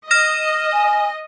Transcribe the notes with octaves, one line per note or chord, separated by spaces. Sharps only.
D#5 F6 A#6 E7
G#5